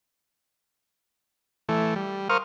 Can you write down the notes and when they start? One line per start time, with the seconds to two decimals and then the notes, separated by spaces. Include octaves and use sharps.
1.69 E3 A3
1.96 G3
2.29 A#4 C5 F5 C#6 D#6 F6